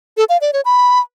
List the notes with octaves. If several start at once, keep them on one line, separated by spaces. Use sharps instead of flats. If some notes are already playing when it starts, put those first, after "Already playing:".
A4
F5
D5
C#5
B5